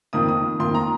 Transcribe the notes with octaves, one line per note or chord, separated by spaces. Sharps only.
F2 D#3 A#3 D#6
D#6
F2 D#3 A#3 C6
A#5